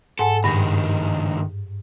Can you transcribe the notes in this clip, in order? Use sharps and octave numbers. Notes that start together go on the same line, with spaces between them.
G#2 A4 F#5 G#5
C#2 G2 D#3 A#6